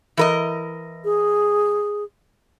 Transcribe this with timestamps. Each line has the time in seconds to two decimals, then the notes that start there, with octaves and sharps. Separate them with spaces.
0.17 E3 A#4 D#5
1.05 G#4